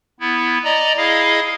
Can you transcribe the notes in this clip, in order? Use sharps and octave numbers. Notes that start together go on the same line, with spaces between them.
B3 E4
D5 D#5 A#5
E4 G#4 D#5 F5